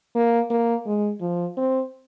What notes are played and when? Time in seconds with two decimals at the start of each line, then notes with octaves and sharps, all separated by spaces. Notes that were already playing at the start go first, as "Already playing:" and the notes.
0.15 A#3
0.50 A#3
0.86 G#3
1.21 F3
1.57 C4